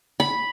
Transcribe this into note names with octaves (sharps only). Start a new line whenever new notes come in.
B5